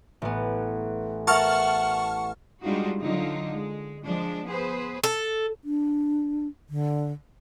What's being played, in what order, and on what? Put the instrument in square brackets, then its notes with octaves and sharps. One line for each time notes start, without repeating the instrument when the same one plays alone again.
[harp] A1 B3
[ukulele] A#4 E5 [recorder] F#5 [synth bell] A5 C#6 F6
[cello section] G3 G#3 D4 D#4 F4 F#4
D3 F#3 D#4 F4
G#3
F3 G#3 D4
B3 G#4 B4 C5
[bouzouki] A4
[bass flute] D4
D3